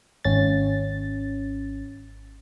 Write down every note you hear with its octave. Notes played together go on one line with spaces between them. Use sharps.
G#1 C#4 A6